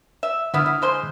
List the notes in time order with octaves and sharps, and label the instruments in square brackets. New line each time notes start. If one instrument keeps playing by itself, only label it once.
[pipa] E5
[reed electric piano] D3 D#6 F6 [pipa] F3 B3 E4
[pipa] E4
G#3 C5 C6